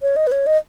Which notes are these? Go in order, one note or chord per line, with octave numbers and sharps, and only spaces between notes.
C#5
D#5
B4
C#5
D#5